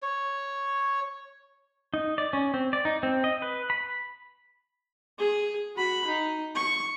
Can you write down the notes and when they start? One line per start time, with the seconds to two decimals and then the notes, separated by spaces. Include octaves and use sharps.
0.02 C#5
1.94 D#4
2.18 D5
2.33 C#4
2.54 C4
2.73 D5
2.85 D#4
3.03 C4
3.24 D#5
3.42 B4
3.70 B5
5.19 G#4
5.76 F#4 B5
6.07 D#4
6.55 C#6